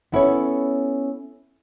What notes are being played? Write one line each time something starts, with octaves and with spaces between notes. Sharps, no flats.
B3 C#4 E4 A4 B4 C#5